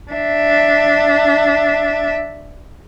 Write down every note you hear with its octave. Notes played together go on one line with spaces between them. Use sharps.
D4 E5